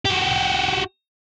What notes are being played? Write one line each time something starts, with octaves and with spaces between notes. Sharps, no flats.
F#4 G4